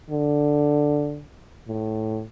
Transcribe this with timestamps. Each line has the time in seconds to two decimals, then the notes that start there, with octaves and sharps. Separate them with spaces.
0.10 D3
1.68 A2